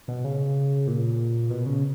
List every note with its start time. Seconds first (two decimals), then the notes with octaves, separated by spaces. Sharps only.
0.08 B2
0.24 C#3
0.87 A#2
1.50 B2
1.66 C#3